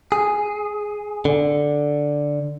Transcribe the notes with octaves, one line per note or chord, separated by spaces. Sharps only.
G#4
D3